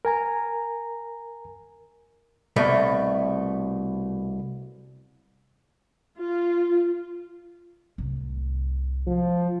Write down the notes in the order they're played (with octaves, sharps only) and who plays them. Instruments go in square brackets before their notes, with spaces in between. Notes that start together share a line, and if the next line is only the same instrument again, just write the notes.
[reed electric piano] A#4 G#5 A#5
[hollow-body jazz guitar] C2 B2 A3
[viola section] F4
[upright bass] C2 A2
[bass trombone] F3 [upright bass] G#3